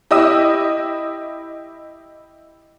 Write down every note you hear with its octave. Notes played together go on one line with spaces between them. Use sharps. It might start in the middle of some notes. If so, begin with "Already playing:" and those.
E4 G4 D#5 D#6 E6